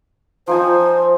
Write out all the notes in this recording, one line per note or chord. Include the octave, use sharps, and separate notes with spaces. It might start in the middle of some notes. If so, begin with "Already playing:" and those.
F3 D#4 C5 G#5